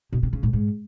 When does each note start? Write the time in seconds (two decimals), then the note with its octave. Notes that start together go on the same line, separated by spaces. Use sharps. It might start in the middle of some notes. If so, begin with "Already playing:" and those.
0.13 B2
0.23 C3
0.33 C#3
0.43 A2
0.53 G#2